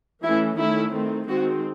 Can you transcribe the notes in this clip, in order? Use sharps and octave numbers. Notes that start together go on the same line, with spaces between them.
E3 A3 C#4 E4
D#3 A3 C#4 E4
D#3 A3 C4
D#3 G#3 C4 F#4